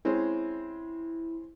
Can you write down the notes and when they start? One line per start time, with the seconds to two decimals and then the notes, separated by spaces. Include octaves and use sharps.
0.05 G#3 C4 C#4 E4